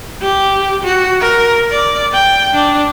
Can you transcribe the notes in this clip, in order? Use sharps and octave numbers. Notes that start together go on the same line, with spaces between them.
G4
F#4
A#4
D5
G5
D4